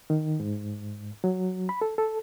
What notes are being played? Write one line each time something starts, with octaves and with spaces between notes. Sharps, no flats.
D#3
G#2
F#3
B5
A4
A4